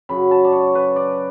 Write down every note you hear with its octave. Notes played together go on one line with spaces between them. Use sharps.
F#2 C#3 F#3 B5
A5
D5
C#5
B4
D5